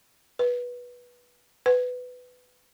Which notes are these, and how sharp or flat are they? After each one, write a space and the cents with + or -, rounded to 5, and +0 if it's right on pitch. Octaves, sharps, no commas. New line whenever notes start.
B4 -15
B4 +15